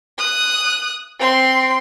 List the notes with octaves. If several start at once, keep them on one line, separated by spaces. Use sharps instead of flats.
D#6 F#6
C4 C6